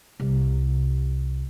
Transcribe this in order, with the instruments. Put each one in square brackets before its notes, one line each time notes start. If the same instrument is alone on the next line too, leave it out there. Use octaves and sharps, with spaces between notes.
[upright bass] C2